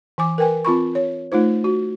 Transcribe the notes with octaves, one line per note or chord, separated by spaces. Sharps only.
E3 G#5 D6
A#4 B4 G5 G#5
C4 F4 B5 C#6
C#5
A3 D#4 F4 C5
F#4